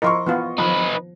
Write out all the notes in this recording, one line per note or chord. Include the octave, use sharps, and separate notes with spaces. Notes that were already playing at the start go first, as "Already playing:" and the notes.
F3 E4 A#4 D#5 C6 C#6
E3 B3 F4
D#3 F3 D#4 B4